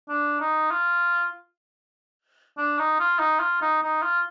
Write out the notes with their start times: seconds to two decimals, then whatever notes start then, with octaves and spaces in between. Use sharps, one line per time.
0.09 D4
0.40 D#4
0.71 F4
2.58 D4
2.78 D#4
2.99 F4
3.19 D#4
3.40 F4
3.62 D#4
3.82 D#4
4.02 F4